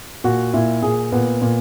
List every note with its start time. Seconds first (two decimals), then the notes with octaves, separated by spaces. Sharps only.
0.24 A#2 F#4
0.53 A#2 E4
0.83 A#2 G#4
1.12 A#2 B3
1.42 A#2